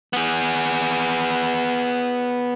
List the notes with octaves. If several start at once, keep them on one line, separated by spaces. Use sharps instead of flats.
B3 G#4